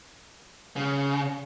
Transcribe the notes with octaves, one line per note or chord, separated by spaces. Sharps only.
C#3